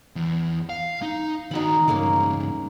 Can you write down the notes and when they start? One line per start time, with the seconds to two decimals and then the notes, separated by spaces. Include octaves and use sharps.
0.16 E2
0.69 F5
1.02 D#4
1.51 D#3 D#4 F#4 B5
1.88 C#2 G2 G#3 A#3 C#4